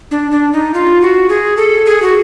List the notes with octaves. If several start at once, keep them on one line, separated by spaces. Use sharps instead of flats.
D4
D4
D#4
F4
F#4
G#4
A4
G#4
F#4